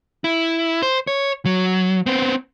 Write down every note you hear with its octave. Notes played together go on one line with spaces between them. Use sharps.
E4
C5
C#5
F#3
B3 C4